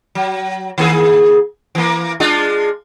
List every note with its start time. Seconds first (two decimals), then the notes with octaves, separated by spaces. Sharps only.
0.15 F#3
0.78 D#3 A#3 G#4
1.75 E3 A#3
2.20 G#3 D4 F4